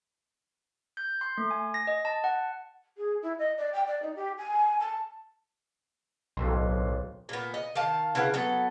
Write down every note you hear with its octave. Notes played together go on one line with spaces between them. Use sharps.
G6
C6
A3
G#5
A#6
D#5
A5
F#5
G#4
E4
D#5
D5
G5
D5
D#4
G4
G#5
A5
D1 B1 A4 C6
A#2 B3
D#5
D#3 F5 A5
C#3 E4 B4 F#5
F#3 B3 A4